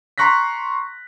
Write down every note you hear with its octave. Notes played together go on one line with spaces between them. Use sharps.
A#5 C6 C#6 F#6 A#6 B6